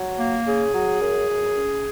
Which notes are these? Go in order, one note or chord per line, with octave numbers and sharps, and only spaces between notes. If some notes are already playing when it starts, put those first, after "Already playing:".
Already playing: F#3
A#3
C#3 G#4
F#3
F#2
F#2
C#4